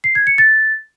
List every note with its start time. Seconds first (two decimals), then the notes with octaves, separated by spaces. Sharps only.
0.04 C7
0.15 G#6
0.27 C#7
0.38 A6